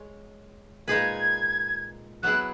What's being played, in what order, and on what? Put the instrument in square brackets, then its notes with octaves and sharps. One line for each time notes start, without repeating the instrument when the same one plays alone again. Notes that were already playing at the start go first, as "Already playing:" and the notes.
Already playing: [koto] G#3 C#5
[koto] A#2 G#3 D#4 G#4 B4 [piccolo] G#6
[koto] F#3 B3 E4 G#4 [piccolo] F#6